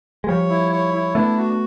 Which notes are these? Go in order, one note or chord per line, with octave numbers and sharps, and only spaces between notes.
G#3
F3 G3 C#5
E4
C#5
E4
A3 B3 D4
F#4